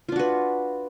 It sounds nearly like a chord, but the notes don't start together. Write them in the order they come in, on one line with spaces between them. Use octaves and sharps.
F4 D4 F#4 B4